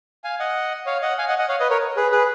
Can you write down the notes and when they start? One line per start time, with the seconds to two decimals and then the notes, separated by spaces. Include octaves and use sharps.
0.24 F5 G#5
0.39 D#5 F#5
0.86 C#5 F5
1.02 D#5 F#5
1.18 F5 G#5
1.28 D#5 F#5
1.38 D#5 F#5
1.49 C#5 F5
1.60 B4 D#5
1.70 A#4 C#5
1.96 G#4 B4
2.12 G#4 B4